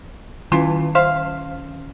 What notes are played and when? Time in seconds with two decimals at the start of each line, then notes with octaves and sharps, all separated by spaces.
0.52 D#3 E3 C#4 F4
0.95 C5 E5 F5